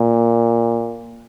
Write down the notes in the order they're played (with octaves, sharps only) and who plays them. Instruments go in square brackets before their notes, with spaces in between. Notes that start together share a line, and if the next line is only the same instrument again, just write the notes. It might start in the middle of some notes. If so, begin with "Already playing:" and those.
Already playing: [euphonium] A#2